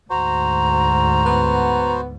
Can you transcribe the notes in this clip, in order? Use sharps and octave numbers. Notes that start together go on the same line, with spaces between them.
D2 G#2 F#4 C5 A#5
B3